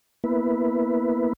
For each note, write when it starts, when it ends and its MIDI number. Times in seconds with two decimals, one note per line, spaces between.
0.24 1.33 58
0.24 1.33 59
0.24 1.33 64
0.24 1.33 71